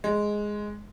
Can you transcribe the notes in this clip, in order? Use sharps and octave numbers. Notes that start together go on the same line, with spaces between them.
G#3